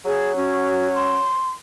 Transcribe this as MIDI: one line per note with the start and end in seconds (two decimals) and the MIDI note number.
0.05 1.28 54
0.05 0.35 68
0.36 1.16 61
0.36 0.88 66
0.95 1.49 84